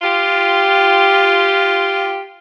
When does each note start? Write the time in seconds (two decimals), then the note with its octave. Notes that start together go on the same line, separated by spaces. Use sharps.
0.02 F4 G4